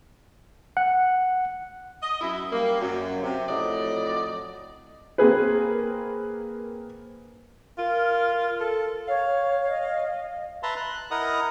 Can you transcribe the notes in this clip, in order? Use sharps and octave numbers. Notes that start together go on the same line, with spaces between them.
F#5
D#5
F#2 E4
G3 A#3
F#2
C3
F2 A2 F#3 D5 D#5
A#3 C4 G#4 B4
F4 A#4
A#4
A4
C#5 F5
D#5
B4 E5 A5 A#5 C6
F#6
E4 A#4 D#5 F#5 A#5 D#6